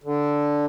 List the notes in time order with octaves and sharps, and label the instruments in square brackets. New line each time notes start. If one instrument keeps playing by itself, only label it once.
[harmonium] D3